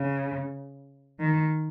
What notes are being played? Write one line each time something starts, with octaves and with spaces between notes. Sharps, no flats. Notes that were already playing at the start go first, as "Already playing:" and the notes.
Already playing: C#3
D#3